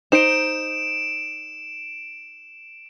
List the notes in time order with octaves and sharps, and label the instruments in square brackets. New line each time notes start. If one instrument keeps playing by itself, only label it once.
[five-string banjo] D#4 C5 [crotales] D7 E7